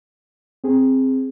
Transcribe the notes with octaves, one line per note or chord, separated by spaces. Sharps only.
C4 G#4